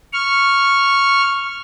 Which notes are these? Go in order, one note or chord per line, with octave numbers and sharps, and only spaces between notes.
C#6 F6